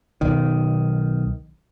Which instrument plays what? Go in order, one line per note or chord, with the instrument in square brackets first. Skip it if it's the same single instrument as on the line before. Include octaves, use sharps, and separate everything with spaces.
[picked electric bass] B1 D#3